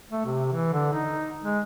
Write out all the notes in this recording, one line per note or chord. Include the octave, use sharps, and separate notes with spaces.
A3
C3
E3
D3
D#4
G#3